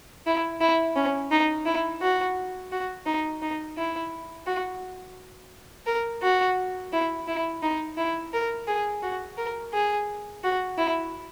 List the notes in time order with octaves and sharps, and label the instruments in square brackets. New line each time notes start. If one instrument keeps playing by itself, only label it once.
[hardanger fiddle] E4
E4
C#4
D#4
E4
F#4
F#4
D#4
D#4
E4
F#4
A#4
F#4
E4
E4
D#4
E4
A#4
G#4
F#4
A#4
G#4
F#4
E4